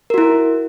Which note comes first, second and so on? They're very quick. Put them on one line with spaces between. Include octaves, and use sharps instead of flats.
A#4 F#4 E4